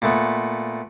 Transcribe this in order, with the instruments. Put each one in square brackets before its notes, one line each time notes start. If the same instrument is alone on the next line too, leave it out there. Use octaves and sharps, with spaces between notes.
[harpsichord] A#2 A3 B3